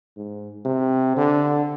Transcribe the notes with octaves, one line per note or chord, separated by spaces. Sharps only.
G#2
C3
D3